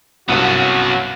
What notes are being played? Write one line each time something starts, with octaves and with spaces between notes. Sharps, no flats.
C2 G2 F#3 B3 C#4 F#4